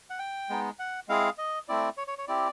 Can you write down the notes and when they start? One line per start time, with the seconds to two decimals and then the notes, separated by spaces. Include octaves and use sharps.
0.10 F#5
0.19 G5
0.50 G#3 B3 D#4
0.79 F#5
1.08 G#3 C4 E4 G#4 F5
1.38 D#5
1.68 A3 C4 E4 D5
1.97 C#5
2.07 C#5
2.18 C#5
2.28 C4 E4 G4 D5